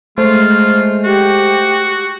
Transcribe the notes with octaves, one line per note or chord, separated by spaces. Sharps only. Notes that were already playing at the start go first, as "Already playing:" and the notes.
G#3 A3 F4 C5
F#4 G4